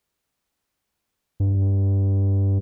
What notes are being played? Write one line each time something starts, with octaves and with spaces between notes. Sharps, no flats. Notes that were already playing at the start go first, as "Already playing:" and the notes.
G2